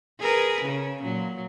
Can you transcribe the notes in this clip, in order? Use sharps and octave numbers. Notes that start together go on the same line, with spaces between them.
G#4 A#4 B4
C#3 C#4
A#2 F#3